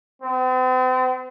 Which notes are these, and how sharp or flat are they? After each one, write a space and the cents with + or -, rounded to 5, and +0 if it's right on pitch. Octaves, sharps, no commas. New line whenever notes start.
C4 -40